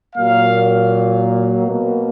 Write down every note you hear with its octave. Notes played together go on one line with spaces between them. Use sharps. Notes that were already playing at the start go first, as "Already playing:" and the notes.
A#2 F#3 A#3 F5
B2 A#3